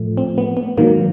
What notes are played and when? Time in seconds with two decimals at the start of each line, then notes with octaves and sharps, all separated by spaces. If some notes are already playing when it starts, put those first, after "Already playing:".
Already playing: A2 F3 A3
0.17 C4
0.38 B3
0.57 B3
0.77 G#2 D#3 F#3 A#3